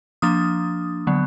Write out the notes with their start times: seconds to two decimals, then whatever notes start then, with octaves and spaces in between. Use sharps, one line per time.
0.22 F3 A#3 D4 D#6
1.07 D3 F#3 B3